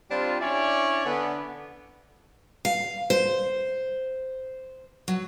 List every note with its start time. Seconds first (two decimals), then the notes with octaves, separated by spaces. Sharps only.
0.11 G3 C4 D4 F4
0.40 C#4 D4 E4 C#5 D5
1.05 D3 B3
2.65 F5
3.10 C5
5.08 F#3